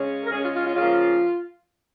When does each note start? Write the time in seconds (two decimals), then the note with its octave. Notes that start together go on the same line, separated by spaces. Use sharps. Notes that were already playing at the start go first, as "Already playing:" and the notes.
Already playing: C#3 G#3 C#4
0.23 A#4
0.30 C#3 G#3 C#4 G#4
0.42 F4
0.53 F4
0.65 F4
0.76 C#3 F3 A#3 C#4 F4